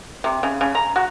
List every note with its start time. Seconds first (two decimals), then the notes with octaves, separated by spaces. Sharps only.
0.24 C3
0.43 C#3
0.61 C#3
0.75 A#5
0.96 F#4